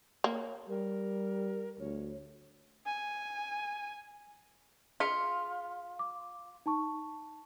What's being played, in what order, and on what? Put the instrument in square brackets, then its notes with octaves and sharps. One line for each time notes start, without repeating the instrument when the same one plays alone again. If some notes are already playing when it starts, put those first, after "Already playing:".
[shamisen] A#3 [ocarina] C#5
[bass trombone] G3 [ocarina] A#4
[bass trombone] D2 [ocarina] C#5
[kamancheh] G#5
[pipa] F4 [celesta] G#4 B6 C#7
[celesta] D6
D#4 A5 C#6